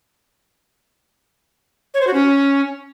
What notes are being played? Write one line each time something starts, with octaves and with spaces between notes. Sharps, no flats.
C#5
C5
F#4
C#4